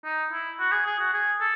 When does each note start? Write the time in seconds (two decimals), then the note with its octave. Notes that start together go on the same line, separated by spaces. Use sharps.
0.05 D#4
0.32 E4
0.59 F#4
0.72 G#4
0.86 G#4
1.00 F#4
1.13 G#4
1.40 A4